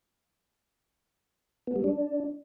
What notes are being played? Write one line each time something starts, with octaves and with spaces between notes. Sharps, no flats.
B3
G3
D4